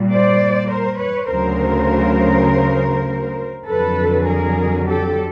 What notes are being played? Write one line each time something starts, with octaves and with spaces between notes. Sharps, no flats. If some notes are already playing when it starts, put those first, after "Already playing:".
Already playing: A#2 G3
C5 D5
A#4 C5
B4 C#5
D2 C#3 F#3 A#4 C5
F2 D3 F#3 A4 B4
G#4 A#4
G4 A4